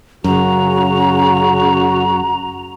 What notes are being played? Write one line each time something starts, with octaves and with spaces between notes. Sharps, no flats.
F#2 C#3 F#4 A#5